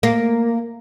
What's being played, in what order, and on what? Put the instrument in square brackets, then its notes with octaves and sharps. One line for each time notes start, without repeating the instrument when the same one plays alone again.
[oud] A#3